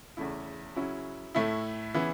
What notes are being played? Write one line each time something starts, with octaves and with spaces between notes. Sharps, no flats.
E2 C#3 A3 E4
C#3 F#3 C#4 E4
A2 A3 E4
C#3 E3 B3 E4